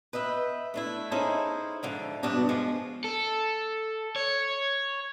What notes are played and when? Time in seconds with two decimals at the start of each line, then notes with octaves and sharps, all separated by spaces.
0.13 B4 D#5 E5 G5
0.74 A3 D4 E4
1.11 C#4 D#4 E4 G#4 A4 C5
1.83 G#2 D3 F3
2.23 G2 B2 B3 D4 F#4
2.49 F3 G#3
3.04 A4
4.16 C#5